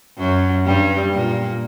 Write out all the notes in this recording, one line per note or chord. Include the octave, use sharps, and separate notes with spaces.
F#2 F#3
G2 G3
A#2 A#3